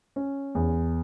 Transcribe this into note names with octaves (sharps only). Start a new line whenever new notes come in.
C#4
E2